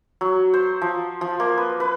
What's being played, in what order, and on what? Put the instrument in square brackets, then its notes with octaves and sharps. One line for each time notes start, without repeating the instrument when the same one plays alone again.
[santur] F#3
C5
F3
F3
A#3
B4
B4